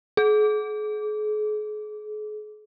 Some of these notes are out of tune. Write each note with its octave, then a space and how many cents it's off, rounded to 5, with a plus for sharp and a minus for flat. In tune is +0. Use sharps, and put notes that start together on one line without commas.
G#4 +40